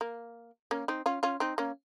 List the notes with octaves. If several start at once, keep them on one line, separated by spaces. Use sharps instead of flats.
A#3
A#3 C#4
C4 D#4
C#4 F4
C#4 F4
C4 D#4
A#3 C#4